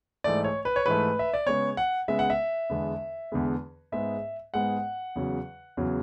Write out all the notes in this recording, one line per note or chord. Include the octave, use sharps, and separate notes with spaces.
G#2 E3 A3 D5
C#5
B4
C#5
G#2 E3 A3 B4
E5
D5
C#3 G#3 B3 C#5
F#5
C#3 G#3 B3 E5
F#5
E5
E2 D3 G#3 B3
E2 D3 G#3 B3
G#2 G#3 B3 E5
G#2 G#3 B3 F#5
E2 C#3 F#3
E2 C#3 F#3